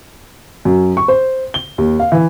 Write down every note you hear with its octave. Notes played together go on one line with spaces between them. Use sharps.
F#2
C#6
C5
G7
D#2
F5
E3